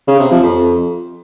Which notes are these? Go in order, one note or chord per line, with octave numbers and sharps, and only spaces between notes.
C#3
C3
F3
F2